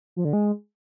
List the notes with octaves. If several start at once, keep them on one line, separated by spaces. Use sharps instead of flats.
F3
D3
G#3